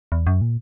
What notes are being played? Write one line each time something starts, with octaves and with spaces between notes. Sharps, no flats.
E2
F#2
A#2